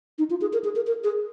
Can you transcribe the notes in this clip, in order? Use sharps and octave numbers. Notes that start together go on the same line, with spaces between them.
D#4
F4
G#4
A#4
G#4
A#4
A#4
G#4